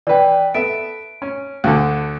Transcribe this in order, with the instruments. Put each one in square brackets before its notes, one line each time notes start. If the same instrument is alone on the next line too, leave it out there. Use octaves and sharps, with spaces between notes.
[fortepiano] E3 B4 [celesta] D5 G5
[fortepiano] B3 A4 E5 [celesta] D7
[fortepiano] C#4
D2 D3